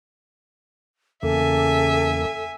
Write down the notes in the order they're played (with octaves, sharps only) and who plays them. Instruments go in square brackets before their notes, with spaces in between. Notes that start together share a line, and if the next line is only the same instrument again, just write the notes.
[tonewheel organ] E2 A#3 [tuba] C#3 [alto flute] A4 [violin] E5 G#5